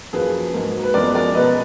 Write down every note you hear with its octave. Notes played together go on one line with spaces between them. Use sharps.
F#2 F3 A#3 G#4 B4
G#2 F#3 A#3
B4
F#2 F3 G#3 B3 A#4 D5
A#4 D5
B2 G#3 B3 B4 D#5